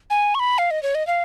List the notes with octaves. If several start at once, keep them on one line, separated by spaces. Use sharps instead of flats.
G#5
C#6
B5
F5
D#5
C#5
D#5
F5